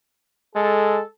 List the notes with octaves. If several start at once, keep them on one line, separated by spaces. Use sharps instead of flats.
G#3 A4